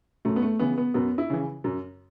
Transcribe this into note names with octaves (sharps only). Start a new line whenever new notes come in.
F#2 A3
B3
A3
C#3 E3 B3
B3
F#2 B3
E4
C#3 E3
F#2